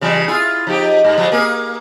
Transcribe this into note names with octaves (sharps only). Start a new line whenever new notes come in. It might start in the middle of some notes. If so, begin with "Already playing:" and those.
C#3 E3 G3
E4 F4 G#4
F3 D#4 G4
G2
F3 G3 G#3
A#3 G#4